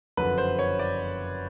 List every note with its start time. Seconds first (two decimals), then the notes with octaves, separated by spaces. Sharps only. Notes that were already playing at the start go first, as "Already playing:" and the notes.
0.17 F#1 F2 D3 F#3 B4
0.38 C5
0.59 C#5
0.79 D5